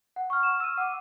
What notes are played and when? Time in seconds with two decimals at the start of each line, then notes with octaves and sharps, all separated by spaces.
0.16 F#5
0.30 C#6 F6
0.43 E7
0.60 E6 D#7
0.78 F#5 D6